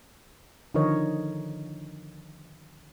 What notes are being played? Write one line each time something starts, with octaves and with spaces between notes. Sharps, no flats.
D3 D#3 F3 A#4 C#5 D#5